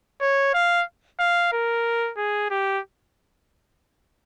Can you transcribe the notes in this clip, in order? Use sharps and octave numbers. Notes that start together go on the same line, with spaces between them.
C#5
F5
F5
A#4
G#4
G4